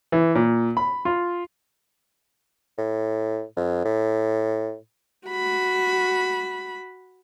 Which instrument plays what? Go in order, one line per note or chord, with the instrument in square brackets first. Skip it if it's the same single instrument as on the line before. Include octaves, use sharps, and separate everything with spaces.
[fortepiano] E3
A#2
B5
F4
[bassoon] A2
F2
A2
[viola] F#4 B5